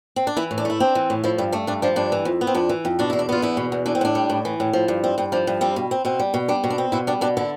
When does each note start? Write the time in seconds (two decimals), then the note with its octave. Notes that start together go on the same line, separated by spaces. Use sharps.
0.16 C4
0.27 D4
0.37 E3 E4
0.51 A2
0.58 D4
0.65 A3 E4
0.80 C4 D4
0.95 E3
1.10 A2
1.24 F3 E4
1.38 G2 E4
1.52 A3 D4
1.67 G2 D4
1.82 F3 D4
1.96 G2 D4
2.12 E3
2.25 F2
2.41 B3
2.47 C4
2.55 F2 D4
2.69 E3
2.85 F2
2.99 B2 D4
3.10 E2 E4
3.19 D4
3.29 B3 F4
3.42 E2 E4
3.57 B2
3.72 E2
3.86 E3 D4
3.95 C4
4.01 A2 D4
4.15 G3
4.30 A2
4.45 E3
4.60 A2
4.73 F3
4.88 G2
5.04 C4
5.18 G2 C4
5.32 F3 D4
5.47 G2
5.61 G3 C4
5.76 B2
5.91 C4
6.05 B2 C4
6.19 G3
6.34 B2
6.48 G3 D4
6.64 B2
6.70 D4
6.78 C4
6.92 B2 E4
7.07 G3 D4
7.21 B2 D4
7.37 D3 E4